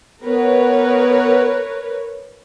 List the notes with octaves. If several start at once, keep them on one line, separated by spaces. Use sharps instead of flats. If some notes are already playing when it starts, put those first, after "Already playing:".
B3 A#4 B4 C#5